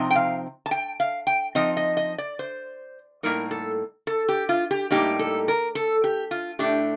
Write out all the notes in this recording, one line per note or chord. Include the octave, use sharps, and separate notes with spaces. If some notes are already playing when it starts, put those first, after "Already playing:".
Already playing: C3 F3 C4 D#4
G5
F5
A5
G5
F5
G5
F3 C4 D#4 D#5
D#5
D#5
D5
C5
A2 G3 A#3 D#4 A#4
A4
A4
G4
F4
G4
A2 G3 A#3 D#4 G4
A4
A#4
A4
G4
F4
A2 A3 D4 G4